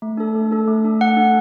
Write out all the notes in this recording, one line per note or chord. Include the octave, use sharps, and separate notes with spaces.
A3
D4 A4
A3
D4 A4
A3
D4 A4
A3 F#5
D4 A4